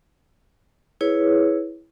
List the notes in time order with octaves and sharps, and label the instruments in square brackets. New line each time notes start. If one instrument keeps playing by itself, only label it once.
[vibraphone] E4 G#4 B4 C#5